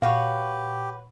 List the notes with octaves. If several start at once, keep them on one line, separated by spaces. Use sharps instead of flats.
A#2 F#4 G4 B4 C#5 F5